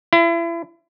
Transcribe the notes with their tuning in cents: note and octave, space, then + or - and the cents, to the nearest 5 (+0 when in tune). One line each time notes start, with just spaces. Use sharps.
E4 +35